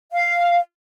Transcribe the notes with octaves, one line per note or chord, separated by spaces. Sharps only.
F5